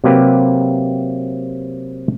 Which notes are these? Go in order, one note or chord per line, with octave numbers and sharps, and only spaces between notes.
C3 F#3 A#3 G4 B4